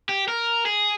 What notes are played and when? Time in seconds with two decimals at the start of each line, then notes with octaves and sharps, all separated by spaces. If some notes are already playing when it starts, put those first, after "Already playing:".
0.09 G4
0.28 A#4
0.66 G#4